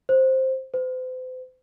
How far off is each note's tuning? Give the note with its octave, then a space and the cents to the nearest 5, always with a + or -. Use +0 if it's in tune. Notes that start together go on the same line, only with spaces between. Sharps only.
C5 +5
C5 -40